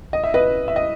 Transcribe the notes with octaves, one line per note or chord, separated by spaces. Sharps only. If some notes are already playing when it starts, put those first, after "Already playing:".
D#5
E5
B4 D#5
E5
D#5